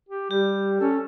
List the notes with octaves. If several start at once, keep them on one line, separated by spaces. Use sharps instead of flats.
G4
G3 G4
C#4 A4